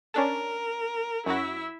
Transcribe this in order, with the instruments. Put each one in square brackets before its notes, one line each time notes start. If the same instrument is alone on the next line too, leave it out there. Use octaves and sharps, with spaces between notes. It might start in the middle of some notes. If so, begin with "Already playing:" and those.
[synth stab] C#4 D4 A5 [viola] A#4
[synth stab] F#2 F#3 F#4 [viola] E4 E5